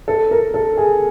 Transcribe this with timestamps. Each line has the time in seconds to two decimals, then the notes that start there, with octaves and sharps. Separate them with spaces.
0.08 A4
0.31 A#4
0.54 A4
0.77 G#4